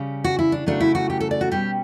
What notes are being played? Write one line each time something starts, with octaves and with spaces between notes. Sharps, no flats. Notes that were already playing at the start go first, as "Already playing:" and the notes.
Already playing: C#3 G3 C#4
F#4
E4
D4
C#3 F#3 A3 C#4 D4
E4
F#4
G4
A4
D5
F#4
B2 G3 C#4 G4